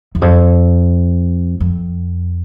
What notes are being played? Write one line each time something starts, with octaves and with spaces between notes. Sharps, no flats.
E2
F2
F2